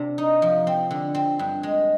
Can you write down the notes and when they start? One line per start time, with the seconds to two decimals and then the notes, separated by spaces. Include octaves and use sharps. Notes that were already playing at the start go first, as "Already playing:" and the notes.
Already playing: C3 D4
0.18 D#4
0.42 F3
0.67 C4
0.91 D3
1.15 C4
1.39 G2
1.63 G#3